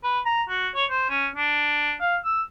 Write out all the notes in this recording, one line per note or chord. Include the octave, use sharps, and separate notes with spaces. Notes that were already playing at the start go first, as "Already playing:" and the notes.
B4
A#5
F#4
C#5
C5
C#4
D4
F5
E6